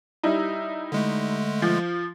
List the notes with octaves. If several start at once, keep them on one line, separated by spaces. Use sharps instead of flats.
G3 D#4 E4
D3 G#3 A3
F3